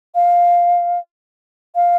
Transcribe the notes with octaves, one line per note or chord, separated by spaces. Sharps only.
F5
F5